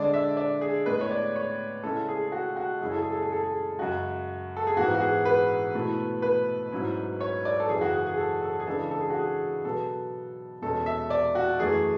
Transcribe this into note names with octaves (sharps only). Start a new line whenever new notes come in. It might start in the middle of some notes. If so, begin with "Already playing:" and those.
Already playing: D3 G#3 D4 D5
E5
D5
G#4
A2 G#3 B3 B4
C#5
D5
C#5
C#3 G#3 C#4 E4 A4
G#4
G#4
F#4
F#4
F#2 C#3 G#3 C#4 E4 G#4
A4
G#4
A4
G#4
A4
G#4
F#2 C#3 G#3 F#4
A4
G#4
G#2 E3 B3 E4 F#4
F#4
G#4
B4
B2 A3 E4
B4
G#2 F#3 C#4 E4
C#5
D5
A4
F#2 C#3 E3 G#4
F#4
G#4
G#4
A4
A4
G#4
C#3 E3 G#3 D4 A4
A4
G#4
F#4
G#4
B2 F#3 B3 A4
E2 B2 G#3 C#4 A4
E5
D5
F#4
F#2 E3 A3 G#4